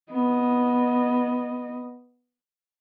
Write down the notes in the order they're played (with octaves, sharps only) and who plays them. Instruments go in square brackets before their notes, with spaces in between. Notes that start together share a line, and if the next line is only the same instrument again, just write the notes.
[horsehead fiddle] B3 D#5